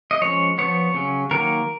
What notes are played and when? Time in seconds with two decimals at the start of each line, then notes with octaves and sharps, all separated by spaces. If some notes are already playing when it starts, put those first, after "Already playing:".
0.11 D#5
0.21 F3 G#3 C#4 C#5
0.58 F3 B3 C#5
0.94 C#3 F#3 C#4
1.31 D#3 F#3 A#3 A#4